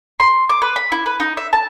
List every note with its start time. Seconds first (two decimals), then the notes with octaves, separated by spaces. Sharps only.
0.20 C6
0.49 D6
0.62 B4
0.76 B5
0.92 E4
1.06 B4
1.20 D#4
1.37 E5
1.53 A5